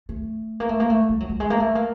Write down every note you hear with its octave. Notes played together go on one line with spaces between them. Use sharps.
A3
A#3
A3
A#3
A3
G3
F#3
G3
G#3
A#3
A3
A#3